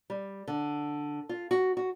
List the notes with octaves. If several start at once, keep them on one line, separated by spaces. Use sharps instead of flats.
G3
D3
F4
F#4
F#4